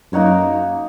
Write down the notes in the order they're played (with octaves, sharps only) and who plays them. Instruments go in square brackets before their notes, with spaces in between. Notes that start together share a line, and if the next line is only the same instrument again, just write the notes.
[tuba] F#2 [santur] A#3 D#4 F#4 C#5